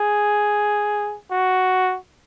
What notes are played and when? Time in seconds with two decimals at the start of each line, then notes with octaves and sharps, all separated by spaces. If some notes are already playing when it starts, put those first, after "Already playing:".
Already playing: G#4
1.31 F#4